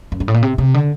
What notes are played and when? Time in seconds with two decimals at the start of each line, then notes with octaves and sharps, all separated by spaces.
0.12 F#2
0.20 G2
0.28 A2
0.34 A#2
0.43 C3
0.58 C3
0.74 D3